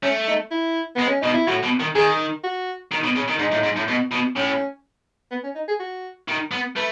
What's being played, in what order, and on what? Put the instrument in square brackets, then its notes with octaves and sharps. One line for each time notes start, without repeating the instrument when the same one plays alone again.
[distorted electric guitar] A3 [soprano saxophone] C#4
[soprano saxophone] D#4
E4
[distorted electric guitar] G#3 [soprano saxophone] B3
[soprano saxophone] C#4
[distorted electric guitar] B2 [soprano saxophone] D#4
[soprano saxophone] E4
[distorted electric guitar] A2 [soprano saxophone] F#4
[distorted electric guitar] B2
D#3
[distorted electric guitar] D#3 [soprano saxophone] G#4
[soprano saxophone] F#4
[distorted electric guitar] D#3
B2
C#3
D#3
[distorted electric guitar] G#2 [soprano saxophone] D#4
[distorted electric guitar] A2
G#2
A2
B2
B2
[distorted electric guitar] A2 [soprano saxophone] C#4
[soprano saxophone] B3
C#4
D#4
G#4
F#4
[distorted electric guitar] D#3
B3
[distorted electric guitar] A3 [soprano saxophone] B4